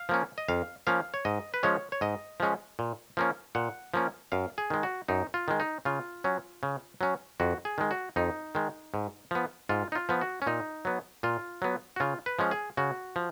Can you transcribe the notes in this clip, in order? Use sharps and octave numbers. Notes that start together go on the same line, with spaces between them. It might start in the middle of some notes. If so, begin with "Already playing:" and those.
Already playing: F5
F3 A#3 C#4
D#5
F2 F5
F3 A#3 C#4 F5
C#5
G#2 D#5
B4
F3 G#3 C#4 C#5
C#5
G#2 D#5
F3 G#3 C#4
A#2
F3 A#3 C#4
A#2 F#5
F3 A#3 C#4
F#2 F5
G#4
D#3 G#3
F#4
F#2 D#4
F4
D#3 G#3
D#4
C#3 F4
F#3 C#4
C#3
F#3 C#4
F2 F#4
G#4
D#3 G#3
F#4
F2 D#4
D#3 G#3
G#2
F3 B3
G#2 F4
D#4
F4
F3 B3
F#4
C#4
A#2 D#4
F#3 B3
A#2 F4
F#3 B3
F#4
C#3 F4
B4
F3 G#3 C#4
G#4
C#3 F#4
F3